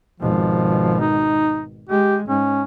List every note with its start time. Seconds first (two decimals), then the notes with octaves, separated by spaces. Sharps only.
0.20 G#1 B2 F3
1.00 D#4
1.89 G#3 G4
2.29 G#2 C#4